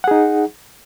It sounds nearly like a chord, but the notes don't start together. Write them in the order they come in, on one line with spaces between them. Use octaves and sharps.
F#5 G#4 D#4